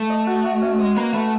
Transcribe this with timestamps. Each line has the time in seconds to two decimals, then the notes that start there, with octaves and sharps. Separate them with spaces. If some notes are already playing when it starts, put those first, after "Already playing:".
Already playing: A3
0.10 D#5
0.27 F#4
0.45 F#4
0.62 C#4
0.79 G#3 D#5
0.96 A#3 B4
1.14 A3 B4